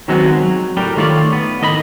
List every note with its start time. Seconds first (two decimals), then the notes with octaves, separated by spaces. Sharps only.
0.08 D#3 F#3 G#3 B3 C4 F#4
0.41 F#3
0.77 A2 G3 D4 A#4 G5
0.96 D#3 A3 F4 C#5 D5
1.33 B3
1.61 A2 D#3 D#5 A5 B5